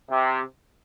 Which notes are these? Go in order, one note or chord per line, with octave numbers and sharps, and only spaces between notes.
C3